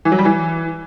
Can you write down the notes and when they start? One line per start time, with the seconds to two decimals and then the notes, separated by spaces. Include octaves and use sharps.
0.05 E3
0.12 F#3
0.18 G3
0.25 E3